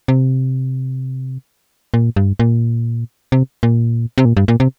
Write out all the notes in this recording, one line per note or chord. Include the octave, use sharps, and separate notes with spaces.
C3
A#2
G2
A#2
C3
A#2
C3
A#2
G2
A#2
C3